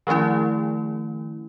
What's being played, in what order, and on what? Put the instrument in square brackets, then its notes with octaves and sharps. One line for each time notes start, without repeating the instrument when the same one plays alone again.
[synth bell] D#3 F3 A3 C#4 E4